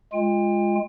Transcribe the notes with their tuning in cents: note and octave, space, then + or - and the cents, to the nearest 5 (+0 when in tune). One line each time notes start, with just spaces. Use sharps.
G#3 +0 F4 +0 G5 +35